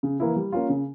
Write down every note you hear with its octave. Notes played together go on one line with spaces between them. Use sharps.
C#3
E3 A#3 E4
G3
A#3 C#4 F4
C#3